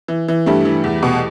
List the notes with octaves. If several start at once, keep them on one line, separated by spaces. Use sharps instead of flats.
E3
E3
G2 G3 A3
E3
E2
B2